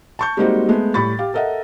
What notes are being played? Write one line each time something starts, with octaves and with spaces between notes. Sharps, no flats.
A5 C#6 G6
G3 G#3 A#3 C4 D#4 F#4
G#3 A3 B3
A2 G3 B5 C#6 A6
G4 F5
A4 A#4 D#5 E5 F#5